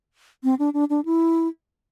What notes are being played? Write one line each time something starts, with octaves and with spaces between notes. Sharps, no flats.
C4
D4
D4
D4
E4